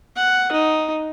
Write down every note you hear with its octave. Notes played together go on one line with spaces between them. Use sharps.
F#5
D#4